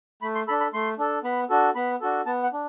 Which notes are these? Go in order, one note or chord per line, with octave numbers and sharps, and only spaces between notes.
A3 B5
C6
D4 A4 B5
B5
A3 C6
D4 A4
B3 B5
D4 F#4 A4
B3 B5
D4 F#4 A4
B3 A5
F#5
D4